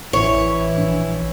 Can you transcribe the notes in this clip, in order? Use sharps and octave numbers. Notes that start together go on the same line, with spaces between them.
A1 E3 E4 C#5
A#1 D4